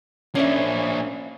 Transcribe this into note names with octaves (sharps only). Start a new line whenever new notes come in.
A#3 C#4 D4 E5